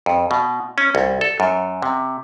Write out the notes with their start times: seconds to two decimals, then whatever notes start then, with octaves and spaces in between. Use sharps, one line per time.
0.06 F2
0.31 B2
0.78 C#4
0.95 C2
1.21 A4
1.40 F#2
1.82 C3